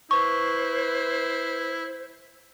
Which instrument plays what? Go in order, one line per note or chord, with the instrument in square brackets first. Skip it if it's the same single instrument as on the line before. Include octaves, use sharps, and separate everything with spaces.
[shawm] E4 [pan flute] B4 [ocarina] C5 [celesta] C#6